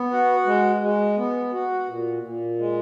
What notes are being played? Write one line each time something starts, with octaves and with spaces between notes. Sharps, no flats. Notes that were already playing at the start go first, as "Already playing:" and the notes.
Already playing: B3
F#4
G#3
G#3
B3
F#4
A#2
A#2
G#3